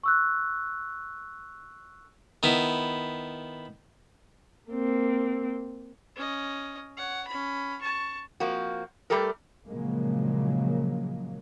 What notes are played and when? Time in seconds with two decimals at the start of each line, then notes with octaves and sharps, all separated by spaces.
0.03 C#6 E6 F#6
2.43 D#3 B3 E4
4.71 A#3 C4
6.16 C#4 D#5
6.97 C#5 F#5
7.27 C#4 B5
7.81 A5 C#6
8.40 F3 A#3 C4 F#4
9.10 G3 A3 G4 A4 A#4
9.67 A#2 C#3 F3 F#3 G#3 A#3